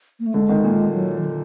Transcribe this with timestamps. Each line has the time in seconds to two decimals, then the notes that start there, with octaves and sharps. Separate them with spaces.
0.19 A#3
0.26 A3
0.34 D3 G#3
0.49 D#3
0.64 A#2
0.93 F#3
1.18 D#3
1.24 D3